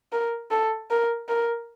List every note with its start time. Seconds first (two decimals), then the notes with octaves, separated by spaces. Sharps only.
0.13 A#4
0.51 A4
0.91 A#4
1.29 A#4